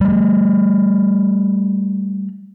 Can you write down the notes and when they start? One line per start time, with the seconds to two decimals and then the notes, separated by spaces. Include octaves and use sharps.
0.01 G3 A3